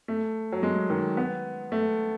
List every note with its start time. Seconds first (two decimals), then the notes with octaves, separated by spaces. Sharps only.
0.08 A3
0.52 F#3
0.63 G#3
0.90 D#3
1.17 B3
1.72 A3